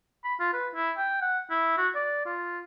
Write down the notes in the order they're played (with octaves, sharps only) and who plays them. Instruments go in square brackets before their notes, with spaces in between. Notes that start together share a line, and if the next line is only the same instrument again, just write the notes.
[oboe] B5
F4
B4
E4
G5
F#5
E4
F#4
D5
F4